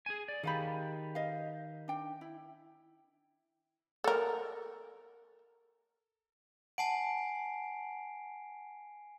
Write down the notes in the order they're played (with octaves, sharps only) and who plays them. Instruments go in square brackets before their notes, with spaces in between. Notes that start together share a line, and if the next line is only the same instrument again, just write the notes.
[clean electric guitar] G#4 G#5
D5
[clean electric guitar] D#3 G4 [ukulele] G#4 F5 B5
[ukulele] D#5 F5
D4 G5
E4
[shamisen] A4 A#4
[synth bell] F#5 A5 [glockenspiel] G#5 C7 D7